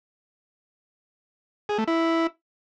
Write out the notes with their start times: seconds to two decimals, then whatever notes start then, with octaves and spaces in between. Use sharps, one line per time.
1.69 G#4
1.78 A3
1.88 E4